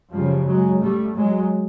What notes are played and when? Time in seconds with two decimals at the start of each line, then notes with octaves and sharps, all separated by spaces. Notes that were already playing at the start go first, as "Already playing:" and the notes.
0.12 F#2 C#3 F3 G3
0.46 F#3 G#3
0.81 G3 A3
1.15 F#3 G#3